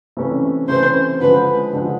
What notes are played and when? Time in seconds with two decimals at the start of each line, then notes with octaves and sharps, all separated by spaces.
0.17 C3 E3 A3 C#4
0.68 C3 E3 A3 C#4 C5
1.20 D3 F3 G#3 B4
1.73 D3 F3 G#3